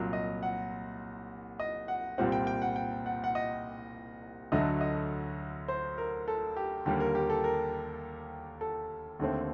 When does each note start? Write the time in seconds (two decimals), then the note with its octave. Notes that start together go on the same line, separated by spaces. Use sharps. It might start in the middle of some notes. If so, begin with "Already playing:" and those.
Already playing: C2 A#2 F#3
0.13 D#5
0.43 F#5
1.60 D#5
1.88 F#5
2.18 C2 A#2 G3 C4 F#5
2.32 G5
2.47 G5
2.62 F#5
2.76 G5
3.06 F#5
3.24 F#5
3.35 D#5
4.52 D2 D3 F#3 A3 D#5
4.81 D#5
5.68 C5
5.98 A#4
6.28 A4
6.57 G4
6.86 D#2 D3 G3 A#3 G4
7.00 A#4
7.15 G4
7.30 A4
7.44 A#4
8.61 A4
9.19 D#2 D3 A3 C4